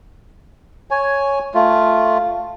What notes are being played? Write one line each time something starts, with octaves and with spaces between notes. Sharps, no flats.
C#5 G#5
A3 F4